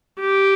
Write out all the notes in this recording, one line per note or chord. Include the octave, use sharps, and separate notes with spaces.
G4